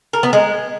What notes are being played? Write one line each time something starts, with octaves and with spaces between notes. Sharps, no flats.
A#4
B3
G#3